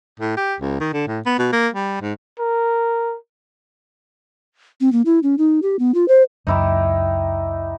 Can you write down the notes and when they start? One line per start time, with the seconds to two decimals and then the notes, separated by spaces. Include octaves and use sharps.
0.20 A2
0.37 G4
0.60 C#2
0.80 D#3
0.93 D3
1.07 A2
1.26 B3
1.39 B2
1.52 A#3
1.74 G3
2.02 G#2
2.39 A#4
4.81 C4
4.92 A#3
5.06 E4
5.23 C#4
5.38 D#4
5.62 G4
5.79 B3
5.94 F4
6.08 C5
6.47 C#2 F#2 D#4 E4 G4